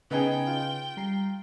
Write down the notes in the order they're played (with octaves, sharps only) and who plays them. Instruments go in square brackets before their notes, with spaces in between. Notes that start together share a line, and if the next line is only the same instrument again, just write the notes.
[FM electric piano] C#3 C#4 [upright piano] B3 D#4 G#4 [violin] G5
[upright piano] F4
[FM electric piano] G3 A#5 C7